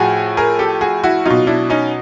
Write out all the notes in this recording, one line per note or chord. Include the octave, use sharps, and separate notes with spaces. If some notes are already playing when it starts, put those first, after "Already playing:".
Already playing: A2 F3 F#4 G#4
G#4 A#4
G4 A4
F#4 G#4
E4 F#4
B2 F#3 D#4 F4
D4 E4
C#4 D#4